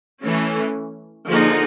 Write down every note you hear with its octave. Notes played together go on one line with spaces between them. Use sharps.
E3 A3 C#4
D3 F3 A#3 D#4 G#4